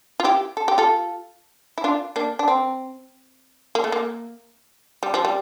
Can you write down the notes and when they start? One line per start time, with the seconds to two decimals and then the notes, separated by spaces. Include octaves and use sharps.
0.20 F4
0.24 E4 G4
0.57 A4
0.68 G4
0.78 F4 A4
1.78 E4
1.84 D4 F4
2.16 A#3 D4
2.39 D4
2.48 C4
3.75 A#3
3.84 A3
3.92 A#3
5.03 G3
5.14 F3
5.25 G3